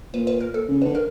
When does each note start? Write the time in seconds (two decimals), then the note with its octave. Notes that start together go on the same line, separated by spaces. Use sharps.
0.14 A#2 B4
0.27 B4
0.40 A#4
0.54 A4
0.68 C#3
0.82 D3 B4
0.95 A#4